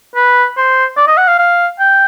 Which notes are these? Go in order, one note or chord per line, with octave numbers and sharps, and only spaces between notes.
B4
C5
D5
D#5
F#5
F5
F5
G5